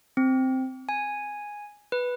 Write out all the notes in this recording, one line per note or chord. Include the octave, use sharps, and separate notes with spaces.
C4
G#5
B4